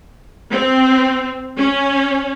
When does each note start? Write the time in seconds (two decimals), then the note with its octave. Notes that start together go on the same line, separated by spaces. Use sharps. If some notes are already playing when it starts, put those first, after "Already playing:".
0.52 C4
1.58 C#4